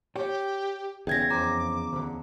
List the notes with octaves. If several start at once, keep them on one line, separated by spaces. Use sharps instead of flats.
G4 C#5 G5
E2 C#3 G#4 E5 G5 G#6 A#6
F2 A#5 D6
D2 D3